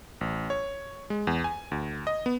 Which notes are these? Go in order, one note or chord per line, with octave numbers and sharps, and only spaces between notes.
A1
C#5
G#3
E2
G#5
D2
D#5
B3